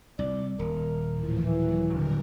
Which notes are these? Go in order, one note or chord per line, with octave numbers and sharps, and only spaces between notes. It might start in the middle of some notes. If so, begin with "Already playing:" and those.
C2 D5
D#1 A#4
A2 E3 F3
A#2 E3 F#3
D3 F#3 G3 A#4